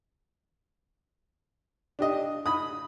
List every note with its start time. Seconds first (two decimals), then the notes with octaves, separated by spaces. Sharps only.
1.99 D4 G4 D#5
2.46 B5 D#6